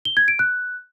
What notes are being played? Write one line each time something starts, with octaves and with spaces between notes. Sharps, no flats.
G7
G#6
D7
F#6